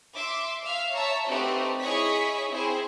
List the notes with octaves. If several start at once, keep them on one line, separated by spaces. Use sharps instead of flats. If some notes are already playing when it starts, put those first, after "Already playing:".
E5 C6 D6
E5 F5
C#5 E5 A5 A#5
A3 C4 D#4 F#4 G4 B4
E4 G#4 C#5 D#5 C#6 B6
C4 E4 G#4 C5